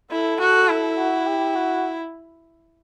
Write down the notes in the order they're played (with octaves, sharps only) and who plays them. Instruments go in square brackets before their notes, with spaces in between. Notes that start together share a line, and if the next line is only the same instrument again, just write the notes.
[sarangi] E4 [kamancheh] A4
[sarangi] F#4
E4
[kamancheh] F#4
G4
F#4